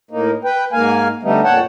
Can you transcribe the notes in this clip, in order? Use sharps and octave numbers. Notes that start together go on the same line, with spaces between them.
A2 A#3 D#4
B4 G5
G#2 A#3 F5 G#5
D3 G3 A3 B3 D#4
F2 A#2 C#5 F#5 G5 A5